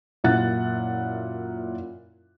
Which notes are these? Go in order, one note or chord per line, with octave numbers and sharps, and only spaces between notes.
F#2 A#2 E4 F#5 F#6 A6